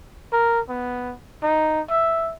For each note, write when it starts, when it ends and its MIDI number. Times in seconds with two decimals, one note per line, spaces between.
0.33 0.61 70
0.69 1.14 59
1.43 1.81 63
1.90 2.32 76